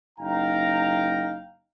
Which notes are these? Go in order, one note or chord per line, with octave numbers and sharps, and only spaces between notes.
F#1 D#4 F5 G5 A#5